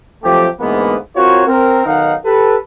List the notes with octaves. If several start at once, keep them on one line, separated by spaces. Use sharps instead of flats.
F3 F#3 A3 C4 G4
D2 G#2 E3 G#3 A#3 B3
C4 F4 F#4 A#4 C5 C#5
C4 A#4
B1 D#3 D#4 F5 F#5
G4 A4 B4